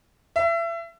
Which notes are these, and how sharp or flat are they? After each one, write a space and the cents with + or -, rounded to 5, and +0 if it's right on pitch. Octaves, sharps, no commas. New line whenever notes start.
E5 +30